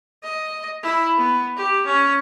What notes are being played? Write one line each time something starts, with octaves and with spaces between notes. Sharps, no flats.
D#5
E4
B3
G4
C#4